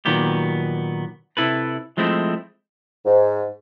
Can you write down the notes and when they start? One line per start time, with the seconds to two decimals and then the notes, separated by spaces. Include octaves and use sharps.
0.05 A#2 D#3 F#3 B3 G4
1.37 C3 E4 A4 B4
1.97 F3 G#3 A3 C4 E4
3.05 G#2